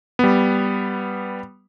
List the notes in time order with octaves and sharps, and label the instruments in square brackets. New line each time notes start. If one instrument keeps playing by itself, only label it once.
[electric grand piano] G3 B3